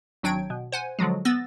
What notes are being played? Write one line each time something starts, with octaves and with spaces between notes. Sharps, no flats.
G#1 F#3 D4 G5 G#6 D7
B2
C5 F#5 G#5
D3 F3 F#3 G#3
B3 E6 A6 A#6